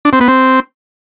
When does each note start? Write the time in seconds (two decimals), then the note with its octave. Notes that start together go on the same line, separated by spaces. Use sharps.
0.05 D4
0.13 C4
0.20 B3
0.28 C4